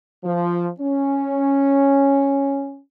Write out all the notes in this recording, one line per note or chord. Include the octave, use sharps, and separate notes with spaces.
F3
C#4